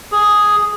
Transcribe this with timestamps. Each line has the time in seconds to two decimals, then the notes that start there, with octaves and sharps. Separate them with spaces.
0.12 G#4